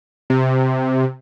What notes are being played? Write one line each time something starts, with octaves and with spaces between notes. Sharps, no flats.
C3